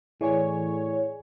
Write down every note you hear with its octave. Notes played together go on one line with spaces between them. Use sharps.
A2 E3 G#4 C#5 D5 G#5